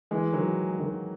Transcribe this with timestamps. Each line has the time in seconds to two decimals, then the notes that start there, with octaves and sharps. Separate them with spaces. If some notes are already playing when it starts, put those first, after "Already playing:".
0.11 E3 G#3
0.33 D#3 F#3
0.69 G#3
0.79 D#3 F#3